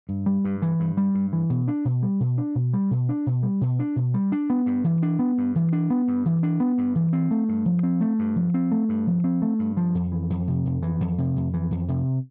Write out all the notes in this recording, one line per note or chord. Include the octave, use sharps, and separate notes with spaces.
G2
G3
G2
E3
G2
G3
G2
E3
B2
D4
B2
G3
B2
D4
B2
G3
B2
D4
B2
G3
B2
D4
B2
G3
D4
B3
G2
E3
D4
B3
G2
E3
D4
B3
G2
E3
D4
B3
G2
E3
C4
A3
G2
F3
C4
A3
G2
F3
C4
A3
G2
F3
C4
A3
G2
F3
F2
E3
F2
C3
F2
E3
F2
C3
F2
E3
F2
C3